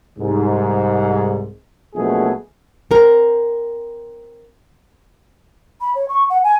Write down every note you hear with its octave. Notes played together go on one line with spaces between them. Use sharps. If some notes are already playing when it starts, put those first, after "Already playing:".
C2 G#2
A#1 B2 F#3 A3 G#4
C4 A#4
B5
C#5
C#6
F#5
G#5